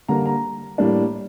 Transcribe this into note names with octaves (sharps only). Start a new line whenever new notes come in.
D3 G3 A#3 A#5
A#5
A2 G3 A#3 D4